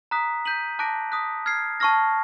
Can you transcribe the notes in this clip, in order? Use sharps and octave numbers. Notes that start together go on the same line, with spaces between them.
A#5 D#6 F#6 B6
G6 B6 D#7 F#7
A5 D6 F#6 A#6 D7
D#6 F#6 B6
F6 G#6 C7
A5 C#6 F6 A#6